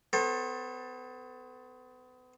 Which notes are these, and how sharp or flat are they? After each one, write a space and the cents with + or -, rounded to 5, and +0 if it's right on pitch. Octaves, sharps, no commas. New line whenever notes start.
B3 +35 A4 +10 C5 +45